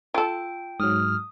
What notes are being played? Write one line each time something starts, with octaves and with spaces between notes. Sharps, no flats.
F4 A4 G5
G#2 F#3 D#6 F6